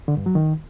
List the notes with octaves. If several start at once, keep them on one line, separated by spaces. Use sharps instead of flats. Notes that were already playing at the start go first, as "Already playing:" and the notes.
D3
G2
F#3
D#3